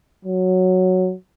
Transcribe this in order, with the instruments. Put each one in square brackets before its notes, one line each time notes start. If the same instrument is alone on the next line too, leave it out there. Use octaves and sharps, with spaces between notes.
[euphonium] F#3